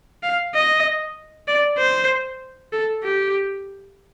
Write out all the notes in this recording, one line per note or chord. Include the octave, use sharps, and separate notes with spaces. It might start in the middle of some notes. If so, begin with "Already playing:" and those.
F5
D#5
D5
C5
A4
G4